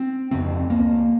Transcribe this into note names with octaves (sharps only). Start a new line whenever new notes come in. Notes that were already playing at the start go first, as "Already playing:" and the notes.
Already playing: C4
F2 C#3 C4
C#2 A#3